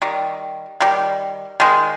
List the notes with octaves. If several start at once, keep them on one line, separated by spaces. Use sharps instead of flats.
D#3 G3
D#3 G3
D#3 G#3